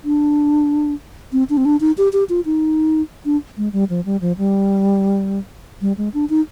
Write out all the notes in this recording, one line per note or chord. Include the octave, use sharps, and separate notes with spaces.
D4
C4
D4
C4
D4
D#4
G4
G4
F4
D#4
D4
G#3
G3
F3
G3
F3
G3
G3
G#3
D4
D#4